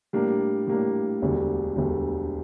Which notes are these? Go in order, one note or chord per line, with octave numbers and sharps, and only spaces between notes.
A2 G3 A#3 D4
A2 G3 A#3 D4
E1 D2 D3 G3
E1 D2 D3 G3